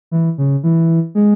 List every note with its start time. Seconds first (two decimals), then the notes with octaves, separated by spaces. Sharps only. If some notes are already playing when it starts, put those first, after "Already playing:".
0.11 E3
0.38 C#3
0.63 E3
1.15 G#3